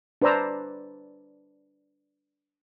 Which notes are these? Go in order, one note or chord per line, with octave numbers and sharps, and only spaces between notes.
D4 B4 C5 D5 A#5 E6